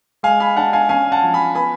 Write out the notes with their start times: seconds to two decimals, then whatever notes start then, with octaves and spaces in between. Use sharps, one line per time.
0.23 G#3 F5 G#5
0.40 G#5 B5
0.57 D4 F#5 A5
0.73 F5 G#5
0.89 C#4 F5 G#5
1.12 F#5 A5
1.22 F3
1.34 G#5 B5
1.55 B3 G#5 B5